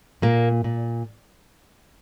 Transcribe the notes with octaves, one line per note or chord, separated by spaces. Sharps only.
A#2 A#3
A#2